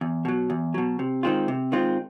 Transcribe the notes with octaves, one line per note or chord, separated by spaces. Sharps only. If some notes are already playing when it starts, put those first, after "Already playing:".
E2
B2 F#3
E2
B2 F#3
C3
D#3 G#3 C4 F4
C3
D#3 G#3 C4 F4